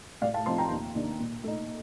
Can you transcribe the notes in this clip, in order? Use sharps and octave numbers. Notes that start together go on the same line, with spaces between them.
A2 D5 F5
F5 A5
F3 C4 D#4 A5 C6
G5 A#5
D#2
D#3 A#3 D4
A#2
A3 D#4